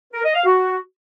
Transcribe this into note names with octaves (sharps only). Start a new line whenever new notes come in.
A#4
D#5
F5
F#4